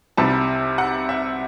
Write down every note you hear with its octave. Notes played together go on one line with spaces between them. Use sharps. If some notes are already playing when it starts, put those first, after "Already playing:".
C2 C3 G3 A5
F#5
E5